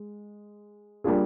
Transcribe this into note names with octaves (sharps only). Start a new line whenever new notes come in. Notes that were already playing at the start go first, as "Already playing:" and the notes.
Already playing: G#3
G3 A#3 D4 F4 G#4